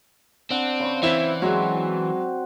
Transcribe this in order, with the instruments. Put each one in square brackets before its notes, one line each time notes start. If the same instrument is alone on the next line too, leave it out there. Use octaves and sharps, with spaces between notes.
[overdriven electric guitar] C4 [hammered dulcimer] D4 F#5
[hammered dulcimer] C#3 C5 C#6
[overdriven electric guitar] E3 [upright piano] C4 E4 E7
[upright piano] F#3 G#3 [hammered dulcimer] C4 F#4